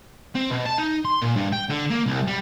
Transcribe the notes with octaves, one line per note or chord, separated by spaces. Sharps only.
C4
B2
A5
D#4
C6
A#2
G2
G5
D3
A#3
C2
G3